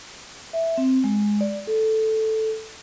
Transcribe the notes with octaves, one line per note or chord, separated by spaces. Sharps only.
E5
C4
G#3
D5
A4